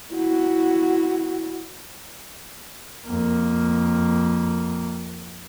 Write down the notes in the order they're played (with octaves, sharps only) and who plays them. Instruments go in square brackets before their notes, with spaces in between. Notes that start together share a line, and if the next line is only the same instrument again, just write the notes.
[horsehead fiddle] E4 F#4
[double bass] F2 A#3